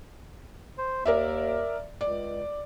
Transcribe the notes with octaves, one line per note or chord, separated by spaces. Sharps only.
C5
D#2 A#4 D5 E5
C#2 D5